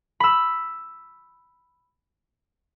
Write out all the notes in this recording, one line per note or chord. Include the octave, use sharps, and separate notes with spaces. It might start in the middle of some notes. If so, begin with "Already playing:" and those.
B5 E6